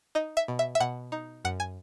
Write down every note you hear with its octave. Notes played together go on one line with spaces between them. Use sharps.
D#4 D#5
E5
B2
E5
E5
B2 F#5
D#4
F#2 F#5
G#5